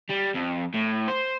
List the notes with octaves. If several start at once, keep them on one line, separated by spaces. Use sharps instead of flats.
G3
F2
A2
C5